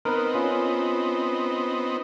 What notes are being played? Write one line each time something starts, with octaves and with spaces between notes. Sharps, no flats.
B3 C4 D#4 A#4 B4
C#4 F4